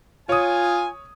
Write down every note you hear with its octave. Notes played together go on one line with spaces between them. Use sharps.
F4 C#5 G#5 D#6